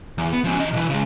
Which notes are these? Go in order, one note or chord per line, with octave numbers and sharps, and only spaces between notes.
E2
B3
F3 C#4
E3 D#5
B1 E3
C#3 G#3